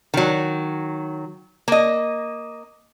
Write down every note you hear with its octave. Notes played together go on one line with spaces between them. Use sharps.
D#3 F#3
A#3 D#5